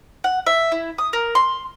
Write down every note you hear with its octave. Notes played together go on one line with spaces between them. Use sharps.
F#5
E5
E4
D#6
A#4
C6